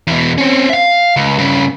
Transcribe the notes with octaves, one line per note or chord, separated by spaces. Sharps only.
E2 B2
C4 C#4
E5 F5
C#2
G2 C#3